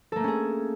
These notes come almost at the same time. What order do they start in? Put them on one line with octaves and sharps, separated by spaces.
A4 A#3 A3 C#4 G#4